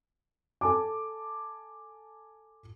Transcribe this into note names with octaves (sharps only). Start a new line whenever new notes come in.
A4 G#5 A5 D6